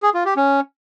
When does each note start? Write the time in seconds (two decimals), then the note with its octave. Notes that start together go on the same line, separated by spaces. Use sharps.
0.03 G#4
0.14 F4
0.25 G4
0.37 C#4